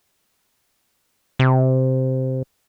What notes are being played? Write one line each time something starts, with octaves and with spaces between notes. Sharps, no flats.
C3